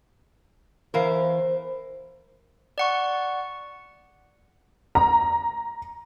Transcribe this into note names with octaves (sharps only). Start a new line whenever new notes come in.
E2 E3 A#4 C5 F5
D5 F#5 C#6
A#5